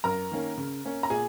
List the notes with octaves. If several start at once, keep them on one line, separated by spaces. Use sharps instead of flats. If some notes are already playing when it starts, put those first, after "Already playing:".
F#2 A#4 A#5
D#3 A#3 C#4
C#3
A#3 C#4
A#5
A#2 G#4 G#5